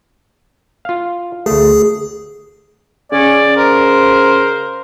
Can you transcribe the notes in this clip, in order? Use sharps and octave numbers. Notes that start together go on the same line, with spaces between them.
F4 F5
D2 A3 G#4
C#3 C#4 D5
A#4 C5